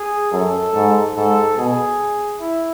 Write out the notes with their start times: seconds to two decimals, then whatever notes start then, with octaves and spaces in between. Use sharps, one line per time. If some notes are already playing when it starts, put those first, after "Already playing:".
Already playing: G#4
0.32 F#2 A4
0.75 G#2
1.16 G#2 A4
1.57 B2 G#4
2.41 E4